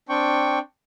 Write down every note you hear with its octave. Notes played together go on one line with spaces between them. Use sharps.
C4 D4 G5 C#6